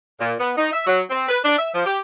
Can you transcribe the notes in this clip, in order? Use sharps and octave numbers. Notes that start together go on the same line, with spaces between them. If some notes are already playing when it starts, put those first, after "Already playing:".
A#2
B3
D#4
E5
F#3
C4
B4
D4
E5
F3
G4